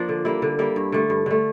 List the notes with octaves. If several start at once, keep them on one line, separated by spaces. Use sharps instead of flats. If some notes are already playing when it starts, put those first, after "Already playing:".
Already playing: F3 A#3 D4
D3
G3 A#3 E4
D3
G3 A#3 E4
G2
D3 A3
G2
D3 A3